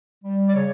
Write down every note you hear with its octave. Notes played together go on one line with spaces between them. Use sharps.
G3
D5
C#3 C#5